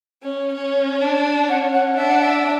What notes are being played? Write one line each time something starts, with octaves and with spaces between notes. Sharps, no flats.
C#4
C#4
D4
C#4 F#5
F#5
D4 E5
F#5
E5